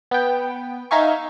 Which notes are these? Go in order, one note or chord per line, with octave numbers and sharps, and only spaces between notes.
B3 G5
D#4 E5 F5 G#5 C#6